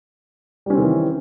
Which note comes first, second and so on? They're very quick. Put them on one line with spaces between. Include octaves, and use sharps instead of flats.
G3 C#4 C4 D#3 E3